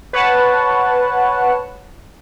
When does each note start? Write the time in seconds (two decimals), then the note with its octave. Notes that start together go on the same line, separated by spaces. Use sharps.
0.13 B4 C#5 F#5 A5